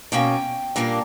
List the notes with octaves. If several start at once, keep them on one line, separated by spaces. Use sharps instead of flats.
B2 A#3 C#4 G5
A#2 G3 A#3 D4